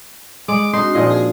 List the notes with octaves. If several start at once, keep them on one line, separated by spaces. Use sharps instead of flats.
G#3 D6
C4 D4 D#4 F#4 C6
A#2 F3 D#5
G#4